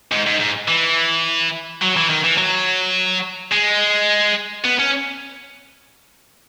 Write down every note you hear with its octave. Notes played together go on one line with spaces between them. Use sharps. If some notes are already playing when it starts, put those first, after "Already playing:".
G#2
G#2
G#2
E3
F#3
E3
D#3
E3
F#3
G#3
B3
C#4